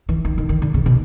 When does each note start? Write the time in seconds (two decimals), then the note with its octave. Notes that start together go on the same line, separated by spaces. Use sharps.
0.09 E3
0.25 D#3
0.38 D#3
0.49 D#3
0.62 D3
0.74 C#3
0.86 B2